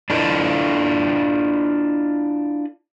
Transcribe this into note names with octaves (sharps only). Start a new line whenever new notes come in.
D4 E4 F4 A4 D5 D#5